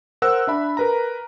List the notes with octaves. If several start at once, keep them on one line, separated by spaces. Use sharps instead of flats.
A#4 C5 F#5 E6 F#6
D4 E5 B5
A#4 B4 A#5